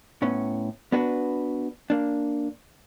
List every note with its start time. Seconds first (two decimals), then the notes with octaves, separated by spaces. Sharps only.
0.22 A2 B3 C#4
0.92 B3 D4 F#4 B4
1.90 A#3 D4